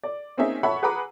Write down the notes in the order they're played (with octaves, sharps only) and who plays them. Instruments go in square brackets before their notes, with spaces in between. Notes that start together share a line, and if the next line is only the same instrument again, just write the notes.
[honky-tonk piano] D5
A#3 C4 C#4 D#4 G#4 E5
C#5 E5 F#5 A5 B5 C#6
G#4 B4 F#5 A#5 B5 D6